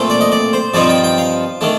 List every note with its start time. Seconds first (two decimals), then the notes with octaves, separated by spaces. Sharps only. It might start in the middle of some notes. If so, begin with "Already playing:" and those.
Already playing: A#2 A3 C4
0.10 D5
0.21 D#5
0.32 D5
0.53 C5
0.74 G2 F3 C4 D#4 D5
0.89 G5
1.04 G5
1.18 F5
1.61 D#3 A3 D4